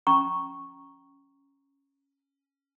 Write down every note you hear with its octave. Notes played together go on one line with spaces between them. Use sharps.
C#4 A#5 C#6